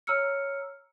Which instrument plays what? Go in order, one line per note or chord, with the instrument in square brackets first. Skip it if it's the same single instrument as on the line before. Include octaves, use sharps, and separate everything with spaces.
[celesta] C#5 A#5 E6 F6 C#7